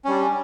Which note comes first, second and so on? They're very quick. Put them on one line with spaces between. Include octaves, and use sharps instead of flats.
C#4 G3 D4